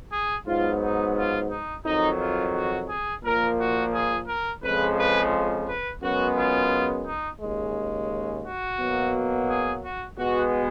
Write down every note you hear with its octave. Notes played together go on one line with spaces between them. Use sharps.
G#4
G#2 F#3 B3 F4
D#4
F4
D#4
F2 D#3 F#3 D#4
F4
F#4
G#4
A#2 F3 A#3 A#4
F#4
G#4
A#4
F2 C#3 F3 G#3 B4
B4
B4
F#2 C#3 G#3 B3 F#4
F4
D#4
D#2 C#3 G#3
F#4
B2 F#3 A#3
G#4
F#4
B2 G#3 B3 F#4